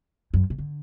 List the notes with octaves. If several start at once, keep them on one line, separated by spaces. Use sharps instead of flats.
F#2
B2
D3